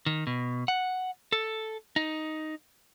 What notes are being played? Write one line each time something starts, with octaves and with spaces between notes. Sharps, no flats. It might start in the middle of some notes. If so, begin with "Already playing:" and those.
D#3
B2
F#5
A4
D#4